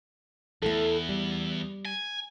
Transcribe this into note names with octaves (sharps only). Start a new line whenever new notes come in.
E2 A3 E4 A4
G3
G#5